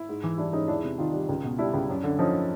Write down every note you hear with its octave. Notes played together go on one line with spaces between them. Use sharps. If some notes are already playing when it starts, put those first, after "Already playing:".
Already playing: E4
G#2
E3
G3 D4 E4
G#2 C#4 D#4
E2 D4 E4
C3
D#3 D#4 F4
G3
C#2
B2
G3 D4 E4
C#2
F#2
D3
F3 C#4 D#4